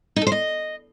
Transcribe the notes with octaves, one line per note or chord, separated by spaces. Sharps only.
D#4
A4
C5
D#5